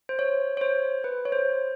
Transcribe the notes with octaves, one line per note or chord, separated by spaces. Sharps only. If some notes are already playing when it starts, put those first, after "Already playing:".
C5
C#5
C#5
C5
B4
C#5
C5